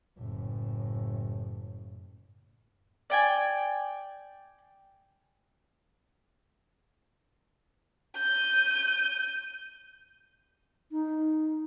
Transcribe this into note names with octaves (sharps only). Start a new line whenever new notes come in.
F#1 A2
D5 G5 G#5
G6 D#7
D#4